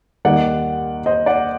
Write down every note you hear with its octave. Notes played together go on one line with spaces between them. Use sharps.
D#2 D#3 G3 A#3 D5 F#5
C5 D#5
D5 F#5